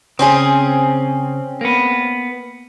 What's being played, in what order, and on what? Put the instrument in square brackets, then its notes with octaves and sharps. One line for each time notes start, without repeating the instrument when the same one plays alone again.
[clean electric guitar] C#3 [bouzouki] C4 C#4 G#4
[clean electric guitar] A#3 B3